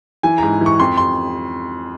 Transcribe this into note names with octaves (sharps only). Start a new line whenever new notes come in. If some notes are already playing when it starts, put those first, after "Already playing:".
E3 G#5
A#5
G#2
E3 C#6
F2 C6
C6